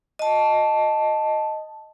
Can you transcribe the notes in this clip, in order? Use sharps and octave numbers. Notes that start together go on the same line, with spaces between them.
D#5 A5